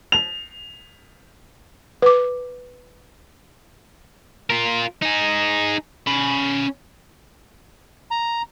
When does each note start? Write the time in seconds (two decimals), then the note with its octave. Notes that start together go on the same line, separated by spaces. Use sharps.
0.12 F7
2.02 B4 D6
4.50 F4 A#4
5.02 D#4 G#4
6.07 C#4 B5
8.11 A#5